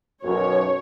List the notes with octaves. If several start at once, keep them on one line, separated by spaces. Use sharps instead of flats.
B1 F#2 C#5